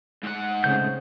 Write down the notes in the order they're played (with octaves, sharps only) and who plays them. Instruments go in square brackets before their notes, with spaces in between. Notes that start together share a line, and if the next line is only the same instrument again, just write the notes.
[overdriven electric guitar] G#2 F#5
[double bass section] C#3 C4 C#4 [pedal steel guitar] G#3 A3 G6